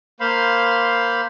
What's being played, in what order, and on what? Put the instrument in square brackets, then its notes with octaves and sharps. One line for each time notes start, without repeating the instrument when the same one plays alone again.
[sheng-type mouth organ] A#3 C5 F5 B5 C6